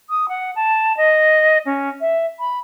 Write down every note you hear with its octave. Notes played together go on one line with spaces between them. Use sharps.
D#6
F#5
A5
D#5
C#4
E5
B5